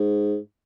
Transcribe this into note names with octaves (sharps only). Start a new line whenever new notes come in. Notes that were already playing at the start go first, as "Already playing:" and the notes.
Already playing: G#2